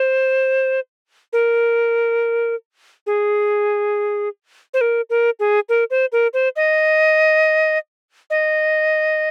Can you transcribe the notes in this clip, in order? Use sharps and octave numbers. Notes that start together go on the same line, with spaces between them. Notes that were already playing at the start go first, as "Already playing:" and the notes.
Already playing: C5
A#4
G#4
C5
A#4
A#4
G#4
A#4
C5
A#4
C5
D#5
D#5